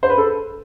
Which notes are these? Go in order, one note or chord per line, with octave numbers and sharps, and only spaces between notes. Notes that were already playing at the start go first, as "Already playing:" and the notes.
C5
B4
A4